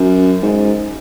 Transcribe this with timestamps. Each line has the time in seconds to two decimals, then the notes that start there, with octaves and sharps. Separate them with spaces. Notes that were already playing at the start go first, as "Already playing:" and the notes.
Already playing: F#2
0.42 G#2